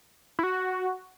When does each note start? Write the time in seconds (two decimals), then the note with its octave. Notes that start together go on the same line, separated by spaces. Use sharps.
0.39 E4
0.43 F#4